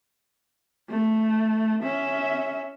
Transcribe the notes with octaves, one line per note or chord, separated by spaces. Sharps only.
A3
C#4 E5